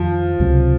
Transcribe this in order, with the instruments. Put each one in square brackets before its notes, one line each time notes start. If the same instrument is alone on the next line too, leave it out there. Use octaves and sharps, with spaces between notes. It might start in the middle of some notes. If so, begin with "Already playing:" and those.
Already playing: [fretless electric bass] F2 D#3 F#3 [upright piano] F3
[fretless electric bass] C#2 C3 F#3